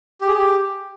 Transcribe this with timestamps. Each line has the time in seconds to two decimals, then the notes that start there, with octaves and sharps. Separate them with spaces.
0.21 G4
0.27 G#4
0.33 G4